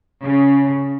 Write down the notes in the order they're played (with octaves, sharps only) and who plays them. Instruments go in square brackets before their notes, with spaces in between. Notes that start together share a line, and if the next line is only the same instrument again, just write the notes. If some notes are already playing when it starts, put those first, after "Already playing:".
[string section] C#3